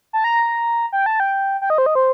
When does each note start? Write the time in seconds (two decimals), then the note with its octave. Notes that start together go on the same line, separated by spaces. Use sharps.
0.13 A5
0.24 A#5
0.93 G5
1.06 A5
1.20 G5
1.62 G5
1.70 D#5
1.78 C5
1.86 D#5
1.95 C5